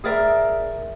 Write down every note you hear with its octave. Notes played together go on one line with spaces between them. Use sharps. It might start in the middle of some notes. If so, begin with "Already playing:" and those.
G#4 A#4 D5 E5